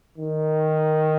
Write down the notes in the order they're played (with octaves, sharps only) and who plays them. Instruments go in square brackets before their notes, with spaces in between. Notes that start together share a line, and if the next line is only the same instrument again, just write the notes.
[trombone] D#3